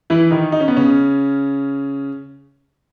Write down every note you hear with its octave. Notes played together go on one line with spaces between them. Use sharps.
E3 E4
D#3 D#4
D#4
C#4
B3
C#3 C#4